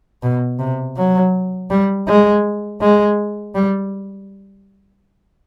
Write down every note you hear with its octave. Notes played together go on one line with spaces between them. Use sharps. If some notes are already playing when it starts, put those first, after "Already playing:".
B2
C3
F#3
G3
G#3
G#3
G3